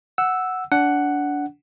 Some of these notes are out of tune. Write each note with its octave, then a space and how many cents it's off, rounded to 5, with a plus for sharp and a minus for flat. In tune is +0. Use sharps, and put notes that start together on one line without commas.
F#5 +0 E6 +0
D4 -25 F#5 +5